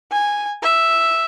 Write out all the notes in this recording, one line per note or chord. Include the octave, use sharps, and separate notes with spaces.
G#5
E5